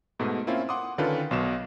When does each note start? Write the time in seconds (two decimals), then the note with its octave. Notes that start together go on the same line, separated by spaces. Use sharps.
0.19 G#2 B2 A3
0.47 A#3 C4 C#4 E4 F4
0.69 F#5 C6 D6 D#6
0.98 D3 D#3 C#4 F4 A4 B4
1.31 B1 B2 E7